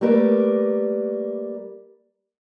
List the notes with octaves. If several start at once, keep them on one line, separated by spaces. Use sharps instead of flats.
G3 A3 A#3 A#4 B4 D5